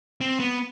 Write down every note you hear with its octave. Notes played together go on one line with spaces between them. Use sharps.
C4
B3